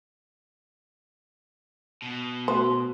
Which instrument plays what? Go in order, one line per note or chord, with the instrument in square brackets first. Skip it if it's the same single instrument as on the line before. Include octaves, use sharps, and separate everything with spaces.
[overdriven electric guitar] B2
[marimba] A3 F#4 [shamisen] C5